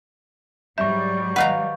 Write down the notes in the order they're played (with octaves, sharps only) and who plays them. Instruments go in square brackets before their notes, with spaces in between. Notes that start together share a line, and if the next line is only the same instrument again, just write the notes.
[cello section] G#2 F#3 G3 [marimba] E5 [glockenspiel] C#6 G6
[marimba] D#3 D#5 F#5 [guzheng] B4 F5 A#5